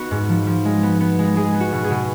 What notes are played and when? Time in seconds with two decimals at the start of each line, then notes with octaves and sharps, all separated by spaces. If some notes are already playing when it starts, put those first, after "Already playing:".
Already playing: B3 D#4 F#4
0.11 G#2
0.29 F3
0.47 F3
0.65 G#3
0.83 B3
1.00 B3
1.19 G#3
1.36 G#3 G#4
1.54 B3
1.60 F#4
1.72 B2
1.84 G#4
1.90 B2